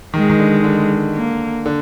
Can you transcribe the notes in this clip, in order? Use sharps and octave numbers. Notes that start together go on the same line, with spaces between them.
D#3 G#3
D#3
D3
D3
A#3
D3